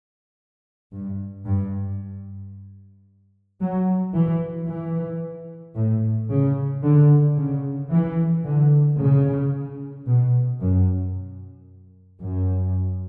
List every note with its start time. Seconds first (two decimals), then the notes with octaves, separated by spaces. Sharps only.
0.91 G2
1.45 G2
3.60 F#3
4.14 E3
4.67 E3
5.76 A2
6.29 C#3
6.83 D3
7.37 C#3
7.91 E3
8.45 D3
8.99 C#3
10.06 B2
10.60 F#2
12.21 F#2